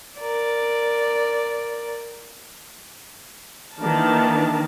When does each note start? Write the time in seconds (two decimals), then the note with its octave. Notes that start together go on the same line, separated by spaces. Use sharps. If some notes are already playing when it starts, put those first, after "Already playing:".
0.20 A#4 D5
3.78 D#3 E3 A#3 D4 A#4 A5